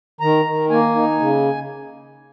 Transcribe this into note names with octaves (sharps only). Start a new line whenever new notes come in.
D#3 A#5
D#3
A#3 G#5
D#4
C#3